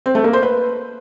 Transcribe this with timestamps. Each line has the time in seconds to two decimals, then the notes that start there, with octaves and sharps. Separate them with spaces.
0.06 C4
0.15 A3
0.24 A#3
0.33 C5
0.43 B4